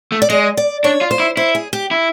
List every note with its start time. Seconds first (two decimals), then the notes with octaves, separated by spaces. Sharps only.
0.12 A3
0.22 D5
0.30 G#3 D#5
0.57 D5
0.84 D4 C#5
1.01 F4
1.11 C5
1.20 E4
1.37 E4 C5
1.55 G#4
1.73 G4
1.91 E4